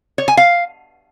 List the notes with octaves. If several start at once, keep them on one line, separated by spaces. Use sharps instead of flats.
C#5
G#5
F5